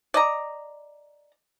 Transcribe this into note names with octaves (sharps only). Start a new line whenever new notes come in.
D5 D#5 A#5